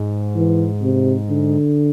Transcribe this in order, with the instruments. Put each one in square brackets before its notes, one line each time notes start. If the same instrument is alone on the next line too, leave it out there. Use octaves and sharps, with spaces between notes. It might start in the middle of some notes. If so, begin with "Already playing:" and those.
Already playing: [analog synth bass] G#2
[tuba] E3
C3
D3